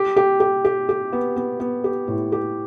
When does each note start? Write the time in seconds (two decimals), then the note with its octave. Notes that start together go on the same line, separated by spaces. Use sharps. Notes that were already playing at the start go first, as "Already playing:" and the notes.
Already playing: G4
0.16 G4
0.40 G4
0.65 G4
0.89 G4
1.13 B3
1.36 B3
1.60 B3
1.84 G4
2.08 A2
2.32 G4